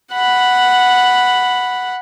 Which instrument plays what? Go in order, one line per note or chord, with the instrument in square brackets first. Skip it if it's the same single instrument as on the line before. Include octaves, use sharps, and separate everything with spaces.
[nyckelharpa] F#5 B5